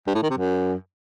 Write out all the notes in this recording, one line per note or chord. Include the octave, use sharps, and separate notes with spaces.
G2
A2
D#3
C3
F#2